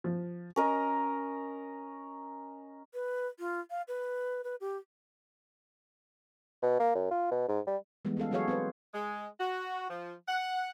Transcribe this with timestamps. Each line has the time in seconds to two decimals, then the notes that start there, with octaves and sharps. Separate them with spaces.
0.04 F3
0.56 C#4 A#4 D#5
2.94 B4
3.39 F4
3.70 F5
3.88 B4
4.44 B4
4.61 G4
6.62 B2
6.80 A#3
6.95 F#2
7.11 F4
7.31 B2
7.48 G#2
7.67 G3
8.05 E3 G3 G#3 B3
8.17 B3 C#4 A4 F5
8.31 F#3 F#4 G#4 A4 C#5 F5
8.48 C4 B4 C5
8.94 G#3
9.40 F#4
9.89 F3
10.28 F#5